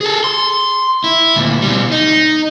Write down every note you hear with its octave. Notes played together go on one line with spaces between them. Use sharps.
G#4 A4
C6
E4
D2 A#2
B2 G3
D#4